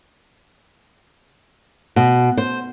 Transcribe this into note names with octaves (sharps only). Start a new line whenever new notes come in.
B2
C5